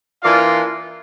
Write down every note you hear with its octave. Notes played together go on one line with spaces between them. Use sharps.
E3 A#3 D4 F4 D5 F5